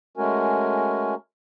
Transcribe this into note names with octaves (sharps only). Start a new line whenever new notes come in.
G#3 A3 C#4 F#4 A#4 G#5